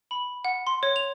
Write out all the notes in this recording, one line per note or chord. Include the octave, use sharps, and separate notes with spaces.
B5
F#5
C6
C#5
F7